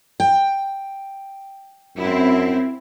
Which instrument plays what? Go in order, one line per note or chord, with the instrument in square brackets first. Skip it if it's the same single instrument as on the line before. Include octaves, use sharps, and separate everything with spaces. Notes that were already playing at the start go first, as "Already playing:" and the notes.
[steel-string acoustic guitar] G5
[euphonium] F#2 [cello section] C4 E4